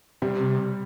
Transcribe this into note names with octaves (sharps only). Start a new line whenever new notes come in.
C3 G3